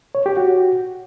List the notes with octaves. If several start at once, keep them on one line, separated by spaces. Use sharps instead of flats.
C#5
G4
F#4